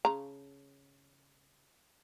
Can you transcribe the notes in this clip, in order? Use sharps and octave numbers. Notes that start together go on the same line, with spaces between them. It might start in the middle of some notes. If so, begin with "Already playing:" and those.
C#3 A#5